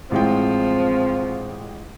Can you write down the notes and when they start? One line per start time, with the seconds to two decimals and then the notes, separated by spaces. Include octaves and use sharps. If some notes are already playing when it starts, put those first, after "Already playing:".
0.11 A1 F3 G#3 C4 G5